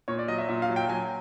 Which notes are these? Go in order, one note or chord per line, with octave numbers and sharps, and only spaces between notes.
A#2 C#5
D5
F#3 D#5
E5
A#2 E5
F5
F#3
G5
F#3 G#5